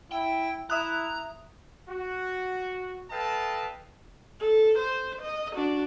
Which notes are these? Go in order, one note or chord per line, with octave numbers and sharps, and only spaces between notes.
E4 G5
E4 E5 A#5 D#6 F#6
F#4
A4 B4 D#5 F5 G5 A5
A4
C5
D#5
D4 F#4